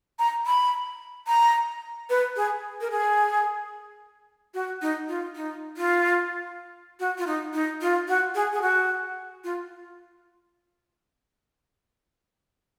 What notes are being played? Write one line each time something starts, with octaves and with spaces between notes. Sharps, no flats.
A#5
B5
A#5
B4
G#4
A#4
G#4
F#4
D#4
F4
D#4
F4
F#4
F4
D#4
D#4
F4
F#4
G#4
G#4
F#4
F4